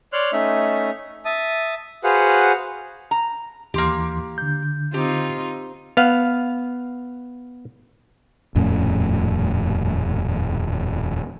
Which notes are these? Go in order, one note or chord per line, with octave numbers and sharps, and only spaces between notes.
C#5 D5 C6 F6 F#6
A3 C#4 D#4 E5
E5 A5 D#6
F#4 G#4 B4 C5 F5 F#5
A#5
D#2 E3 A#3 G4 C6
D3 G6
C4 D#4 F4 G4
B3 F5
D#1 F2 A2 C#4